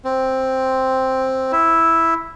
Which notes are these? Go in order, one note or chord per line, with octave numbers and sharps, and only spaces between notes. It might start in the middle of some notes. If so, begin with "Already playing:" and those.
C4
E4